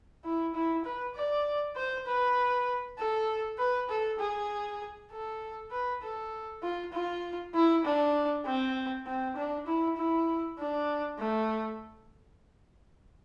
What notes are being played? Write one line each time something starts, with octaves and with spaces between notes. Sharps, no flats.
E4
E4
B4
D5
C5
B4
A4
B4
A4
G#4
A4
B4
A4
F4
F4
E4
D4
C4
C4
D4
E4
E4
D4
A3